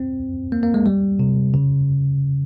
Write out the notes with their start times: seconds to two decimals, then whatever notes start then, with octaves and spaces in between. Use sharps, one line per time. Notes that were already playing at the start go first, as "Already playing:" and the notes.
Already playing: C4
0.52 A#3
0.63 A#3
0.74 G#3
0.86 G3
1.19 C3
1.54 C#3